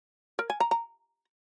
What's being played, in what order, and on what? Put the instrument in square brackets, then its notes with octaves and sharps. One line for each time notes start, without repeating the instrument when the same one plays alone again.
[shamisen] A#4
G#5
A#5
A#5